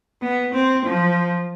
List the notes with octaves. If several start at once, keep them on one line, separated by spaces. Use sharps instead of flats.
B3
C4
F3